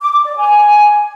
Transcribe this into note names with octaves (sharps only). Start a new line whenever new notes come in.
D6
D6
D5
G#5